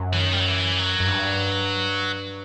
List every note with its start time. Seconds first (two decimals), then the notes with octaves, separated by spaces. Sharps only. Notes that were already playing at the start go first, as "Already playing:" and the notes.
Already playing: F#2
0.13 E3
0.19 D#3
0.32 G3
0.40 F#3
0.48 E3
0.78 F#3
1.00 F#2
1.07 G2